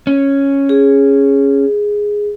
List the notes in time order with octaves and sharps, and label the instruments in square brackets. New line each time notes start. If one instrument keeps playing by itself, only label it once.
[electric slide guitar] C#4
[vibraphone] G#4